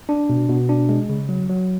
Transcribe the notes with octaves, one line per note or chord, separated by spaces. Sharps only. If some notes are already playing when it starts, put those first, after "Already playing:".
D4
B2
B2
D4
G#3
C#3
F#3
F#3